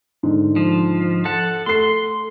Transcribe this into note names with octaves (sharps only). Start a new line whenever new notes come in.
G#2 D3
F3
A4 F#5 A5
A3 A4 C6 C7